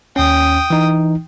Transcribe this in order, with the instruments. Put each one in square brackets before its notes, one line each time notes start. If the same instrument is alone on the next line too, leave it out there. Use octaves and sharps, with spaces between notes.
[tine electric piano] D#2 C#4 [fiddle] G5 D#6
[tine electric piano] E3 D#4